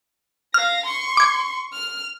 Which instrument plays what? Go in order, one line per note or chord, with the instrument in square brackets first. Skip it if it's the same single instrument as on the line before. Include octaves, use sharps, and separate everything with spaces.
[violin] F5 A#6 [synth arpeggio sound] F6
[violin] C6 C#6
[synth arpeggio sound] D6 G#6
[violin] F6